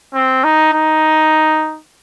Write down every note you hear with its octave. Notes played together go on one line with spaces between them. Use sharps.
C4
D#4
D#4